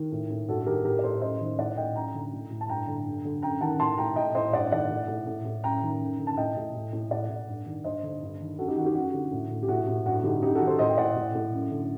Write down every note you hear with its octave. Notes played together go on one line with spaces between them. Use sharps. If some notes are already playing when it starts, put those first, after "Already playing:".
Already playing: D#3
A2
A2
G2 F#4 A4
D#3 G4 A#4
A2 G4 A#4
D5
A2 A4 C5
F#2 C5 D#5
D#3
A2 D5 F#5
A2 D#5 G5
F#2 G5 A#5
D3
A2
A2
A5
G2 G5 A#5
D3
G2
D3
F#2 G5 A#5
D#3 F#5 A5
A2 A5 C6
A2 G5 A#5
A2 D#5 G5
A2 C5 D#5
G2 D5 F#5
D#3 D5 F#5
A2
A2
A2
A2
F#2 G5 A#5
D#3
F#2
D3
A5
A2 D#5 G5
A2
A2
A2
A2 D5 F#5
A2
G2
D#3
G2 C5 D#5
D3
G2
D#3
F#2 F#4 A4
D#4 G4
D#3 F#4
D#4 G4
F#2 F#4
D3
A2
A2
G4
A2 F#4
A2
G2 F#4
D3 D#4 G4
F#2 D#4 G4
F#4 A4
D#3
A4 C5
A2 C5 D#5
G5
A2 D5 F#5
A2
A2
F#2
D3